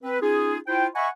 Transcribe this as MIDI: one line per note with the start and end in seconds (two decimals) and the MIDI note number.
0.03 0.20 60
0.03 0.20 71
0.22 0.57 61
0.22 0.57 63
0.22 0.57 65
0.22 0.57 68
0.67 0.86 64
0.67 0.86 65
0.67 0.86 72
0.67 0.86 79
0.96 1.08 75
0.96 1.08 76
0.96 1.08 78
0.96 1.08 80
0.96 1.08 83
0.96 1.08 85